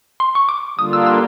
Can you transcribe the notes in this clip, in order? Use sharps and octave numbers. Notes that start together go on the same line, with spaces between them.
C6
C#6
D6
D3 G3 A#3 D4 F4 D#6
E6
E6